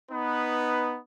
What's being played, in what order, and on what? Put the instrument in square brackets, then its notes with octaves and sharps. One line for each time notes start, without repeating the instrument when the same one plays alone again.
[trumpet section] B3 D#4 B4